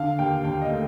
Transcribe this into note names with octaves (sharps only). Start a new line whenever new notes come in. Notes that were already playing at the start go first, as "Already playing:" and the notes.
Already playing: D3 F5
D#2 G5
D#2 G5
D#5
A3